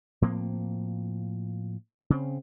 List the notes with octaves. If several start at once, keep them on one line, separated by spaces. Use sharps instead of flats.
A2 F3 A#3 C4
C#3 C4